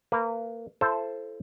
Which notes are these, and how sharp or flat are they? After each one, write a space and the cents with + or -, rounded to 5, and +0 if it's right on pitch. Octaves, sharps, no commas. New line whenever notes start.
A#3 -25 B4 +0
E4 +45 A4 +0 C5 +0